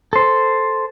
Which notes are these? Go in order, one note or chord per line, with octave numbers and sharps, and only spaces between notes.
A4 C5